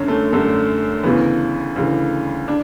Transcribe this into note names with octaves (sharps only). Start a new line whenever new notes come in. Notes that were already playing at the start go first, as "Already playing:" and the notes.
Already playing: F#2 D3 C#4
A3
F#2 D3 A3
D2 C#3 E3 B3
D2 C#3 E3
D4